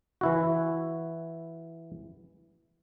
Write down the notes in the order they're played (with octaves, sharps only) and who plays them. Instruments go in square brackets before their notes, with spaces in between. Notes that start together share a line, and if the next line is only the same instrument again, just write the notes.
[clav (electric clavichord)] E3 E4 F#4